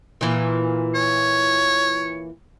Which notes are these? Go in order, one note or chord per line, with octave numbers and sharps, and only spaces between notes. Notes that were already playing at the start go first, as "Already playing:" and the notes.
A#2 E3
C#5